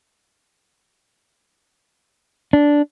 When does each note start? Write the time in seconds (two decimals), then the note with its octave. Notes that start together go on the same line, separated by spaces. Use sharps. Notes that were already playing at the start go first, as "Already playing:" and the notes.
2.53 D4